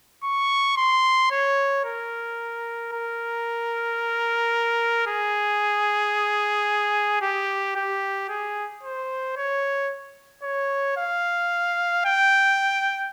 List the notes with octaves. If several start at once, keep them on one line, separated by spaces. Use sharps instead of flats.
C#6
C6
C#5
A#4
A#4
G#4
G4
G4
G#4
C5
C#5
C#5
F5
G5